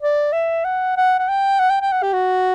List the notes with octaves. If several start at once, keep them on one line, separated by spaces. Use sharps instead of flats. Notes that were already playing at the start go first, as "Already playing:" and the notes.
D5
E5
F#5
F#5
F#5
G5
F#5
G5
G5
F#5
G4
F#4